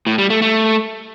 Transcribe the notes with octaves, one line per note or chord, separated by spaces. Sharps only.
A2
G3
A3
A3